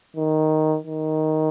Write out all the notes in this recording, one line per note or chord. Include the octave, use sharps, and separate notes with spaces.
D#3
D#3